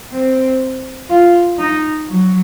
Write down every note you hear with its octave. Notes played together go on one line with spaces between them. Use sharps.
C4
F4
D#4
F#3